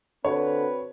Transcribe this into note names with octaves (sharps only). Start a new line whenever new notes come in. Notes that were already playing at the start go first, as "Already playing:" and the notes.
D3 C4 F#4 B4 C#5